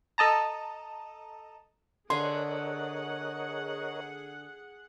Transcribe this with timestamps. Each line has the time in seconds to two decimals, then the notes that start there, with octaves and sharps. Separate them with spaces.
0.18 A4 D#5 A5 A#5
2.10 D3 G#4 A#4 C#5 D#5 F#5 G#5 C6